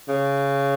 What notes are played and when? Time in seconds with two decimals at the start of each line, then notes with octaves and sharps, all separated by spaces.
0.09 C#3